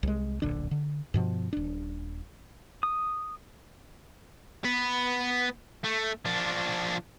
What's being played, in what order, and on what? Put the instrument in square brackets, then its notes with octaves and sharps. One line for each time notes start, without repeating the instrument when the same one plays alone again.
[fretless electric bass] C2 G#3
D1 A#1 D3 D4
D3
G2 B2 F3
D#1 D4
[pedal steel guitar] D#6
[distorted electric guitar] B3 B4
A3
F3 D4